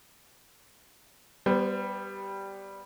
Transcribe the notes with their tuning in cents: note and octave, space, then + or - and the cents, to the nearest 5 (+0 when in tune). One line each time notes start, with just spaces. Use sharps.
G3 +0 B3 +0 C5 -40